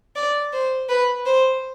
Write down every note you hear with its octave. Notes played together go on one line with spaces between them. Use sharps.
D5
C5
B4
C5